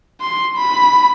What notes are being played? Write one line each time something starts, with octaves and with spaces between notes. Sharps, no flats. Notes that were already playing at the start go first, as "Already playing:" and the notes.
C6
B5